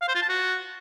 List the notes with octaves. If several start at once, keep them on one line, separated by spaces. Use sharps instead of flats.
F5
C5
F4
A5
F#4